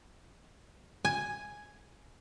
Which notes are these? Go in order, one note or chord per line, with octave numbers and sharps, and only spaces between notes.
G#5